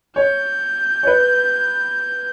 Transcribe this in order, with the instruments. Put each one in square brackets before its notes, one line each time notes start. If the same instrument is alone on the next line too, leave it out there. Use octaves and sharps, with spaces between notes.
[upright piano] C#5 [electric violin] G6
[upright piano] C#5
B4